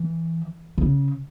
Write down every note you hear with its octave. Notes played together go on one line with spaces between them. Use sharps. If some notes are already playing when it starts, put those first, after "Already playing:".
Already playing: E3
C#3